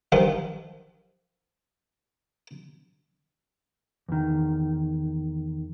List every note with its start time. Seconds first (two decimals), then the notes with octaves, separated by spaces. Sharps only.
0.12 G2 D#3 F3
4.09 E2 D#3